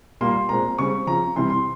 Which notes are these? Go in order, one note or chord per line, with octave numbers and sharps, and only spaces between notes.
A#2 G3 A#3 C6
A#2 G#3 C4 A#5
C#3 G3 C4 C#6
C#3 F3 C4 A#5
C3 E3 G3 C6
C6